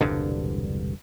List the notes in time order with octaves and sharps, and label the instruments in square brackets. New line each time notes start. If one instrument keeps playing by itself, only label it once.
[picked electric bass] E1 C2 G2 D3